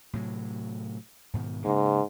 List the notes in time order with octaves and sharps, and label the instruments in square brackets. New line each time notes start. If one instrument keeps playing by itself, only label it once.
[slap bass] A2 C3 F#3
G#2 B2 D#3
[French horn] G#2 [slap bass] C#3 A#3